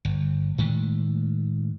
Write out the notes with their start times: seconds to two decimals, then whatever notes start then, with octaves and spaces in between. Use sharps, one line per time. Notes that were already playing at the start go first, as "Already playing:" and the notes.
0.05 G1
0.58 A2 D#3 G#3 A3